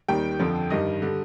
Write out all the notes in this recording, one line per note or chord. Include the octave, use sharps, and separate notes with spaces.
D#2 D#3 G3 G5
F2 D3 F3
G2 D#3 G3 D#5
D3 G3